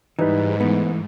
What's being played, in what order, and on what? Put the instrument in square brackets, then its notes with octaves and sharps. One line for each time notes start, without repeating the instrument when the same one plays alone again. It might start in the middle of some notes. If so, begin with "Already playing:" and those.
[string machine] G#2 [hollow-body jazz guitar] E3 G3 [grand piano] D#4 B4
[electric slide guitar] E3 A3 [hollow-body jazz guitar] B3